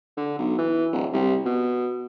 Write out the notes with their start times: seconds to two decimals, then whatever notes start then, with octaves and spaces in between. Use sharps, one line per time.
0.17 D3
0.39 B1
0.58 E3
0.92 D1
1.14 C2
1.46 B2